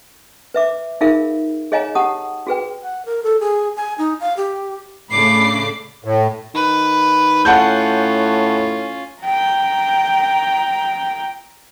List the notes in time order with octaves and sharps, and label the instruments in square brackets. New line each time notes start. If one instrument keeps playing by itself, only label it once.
[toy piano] B4 E5 D6
D#4 F4 G#4 A#4 E5 F5
G#4 C#5 D#5 F5 G#5 A#5
G4 F#5 A5 D#6
F#4 G#4 B4 G5
[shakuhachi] F#5
A#4
A4
G#4
G#5
D#4
F5
G4
[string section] A2 C#3 A3 [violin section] D4 B5 D6 [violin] C7
[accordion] A2
[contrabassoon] D#3 [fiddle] B4
[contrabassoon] A2 [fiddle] C#4 F4 [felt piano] F#5 A5 G6
[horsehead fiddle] G5 A#5